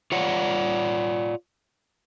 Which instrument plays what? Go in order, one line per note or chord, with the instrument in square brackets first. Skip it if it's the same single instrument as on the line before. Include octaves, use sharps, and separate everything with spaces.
[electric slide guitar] F4 C#5 D5 F#5